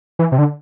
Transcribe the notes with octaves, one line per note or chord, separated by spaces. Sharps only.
E3
C3
D3